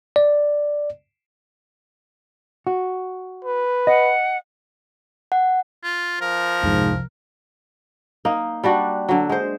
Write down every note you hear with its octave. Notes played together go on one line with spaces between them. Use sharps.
D5
F#4
B4
D#5 F#5
F#5
F4
F3 A#4
C2 F2 G#2
A#3 D#4
G3 D4 F#4
D3 F#3
G#3 C5